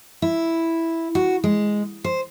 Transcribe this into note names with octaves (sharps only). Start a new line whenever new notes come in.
E4
F#4
G#3
C5